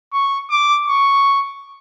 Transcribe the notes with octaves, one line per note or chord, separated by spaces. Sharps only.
C#6
D6
C#6